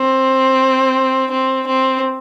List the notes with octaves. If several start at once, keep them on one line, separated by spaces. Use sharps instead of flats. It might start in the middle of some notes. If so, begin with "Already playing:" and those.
Already playing: C4
C4
C4